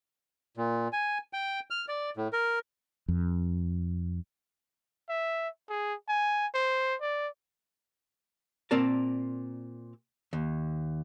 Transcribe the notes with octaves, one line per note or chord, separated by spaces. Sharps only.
A#2
G#5
G5
F6
D5
A2
A#4
F2
E5
G#4
G#5
C5
D5
A#2 C4 A#4 D5 A5
D#2